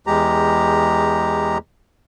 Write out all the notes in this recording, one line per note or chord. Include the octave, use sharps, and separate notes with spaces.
E2 G#3 G4 A#5